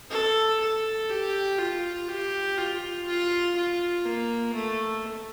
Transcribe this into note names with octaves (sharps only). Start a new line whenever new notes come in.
A4
A4
G4
F4
G4
F4
F4
F4
A#3
A3